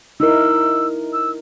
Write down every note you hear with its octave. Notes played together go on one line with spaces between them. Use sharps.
D#4 E4 A#4 E6
E6